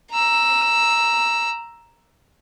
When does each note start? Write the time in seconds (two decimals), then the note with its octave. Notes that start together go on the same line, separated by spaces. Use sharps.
0.11 A#5 E6